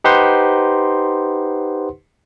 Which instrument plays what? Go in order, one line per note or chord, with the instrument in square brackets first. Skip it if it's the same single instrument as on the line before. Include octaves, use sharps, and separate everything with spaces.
[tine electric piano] D#4 G4 B4 C5 F#5 C6